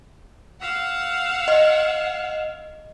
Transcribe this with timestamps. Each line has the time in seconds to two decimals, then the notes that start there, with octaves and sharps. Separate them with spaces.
0.61 F5 F#5 E6
1.48 D#5